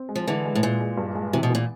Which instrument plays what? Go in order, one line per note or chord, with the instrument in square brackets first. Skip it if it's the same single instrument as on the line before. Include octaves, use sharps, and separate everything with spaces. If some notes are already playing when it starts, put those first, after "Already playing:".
Already playing: [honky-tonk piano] C4
G#3
[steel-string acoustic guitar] F3
[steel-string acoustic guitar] D3 E3 [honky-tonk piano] G#3
[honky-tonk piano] G#3
[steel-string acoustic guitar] A2
[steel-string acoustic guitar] A#2 [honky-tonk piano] G#3
[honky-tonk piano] G#3
G2
G#3
[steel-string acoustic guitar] C3 [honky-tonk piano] E3
[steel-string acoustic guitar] B2
[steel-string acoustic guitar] A#2 [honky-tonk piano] E3